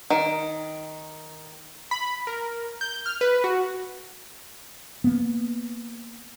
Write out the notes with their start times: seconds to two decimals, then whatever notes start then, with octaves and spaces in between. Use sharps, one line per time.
0.10 D#3
1.91 B5
2.27 A#4
2.81 G6
3.06 F6
3.21 B4
3.44 F#4
5.04 A#3 B3